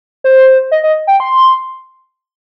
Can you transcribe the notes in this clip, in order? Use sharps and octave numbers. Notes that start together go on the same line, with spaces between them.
C5
D#5
D#5
G5
C6